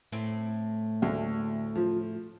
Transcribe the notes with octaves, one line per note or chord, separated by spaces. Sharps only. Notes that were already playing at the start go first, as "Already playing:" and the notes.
A2 C4
D2
F3